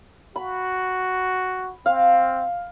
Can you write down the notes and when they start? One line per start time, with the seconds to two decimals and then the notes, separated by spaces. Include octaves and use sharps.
0.36 F#4 B5
1.86 C4 F5